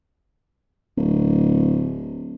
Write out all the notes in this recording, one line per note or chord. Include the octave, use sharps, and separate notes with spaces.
D1